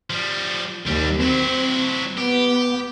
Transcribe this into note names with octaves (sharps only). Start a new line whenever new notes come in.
F3 G3
D#2 C3 G3
F#3 C4 E4
B3 G4